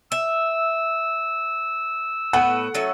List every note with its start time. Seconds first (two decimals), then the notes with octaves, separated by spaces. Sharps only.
0.12 E5 E6
2.33 A2 B3 B4 F#5
2.75 F#3 C#4 A4 E5